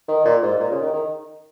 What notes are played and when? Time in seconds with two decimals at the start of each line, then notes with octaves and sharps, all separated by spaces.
0.08 D#3
0.25 A#2
0.42 G#2
0.60 A#2
0.71 C#3
0.82 D#3
0.93 D#3